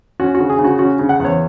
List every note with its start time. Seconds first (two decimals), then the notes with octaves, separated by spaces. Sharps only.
0.20 C#4 F#4
0.35 F#4
0.40 C#3
0.49 G#4
0.59 C#3
0.64 F#4
0.79 C#4 F#4
0.99 C#3
1.09 F#5
1.20 E2 C#5